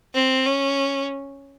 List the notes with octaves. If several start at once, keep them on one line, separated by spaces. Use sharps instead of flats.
C4
C#4